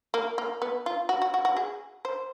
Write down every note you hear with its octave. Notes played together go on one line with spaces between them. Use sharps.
A#3
A#3
B3
F4
F#4
F#4
F#4
F#4
G#4
C5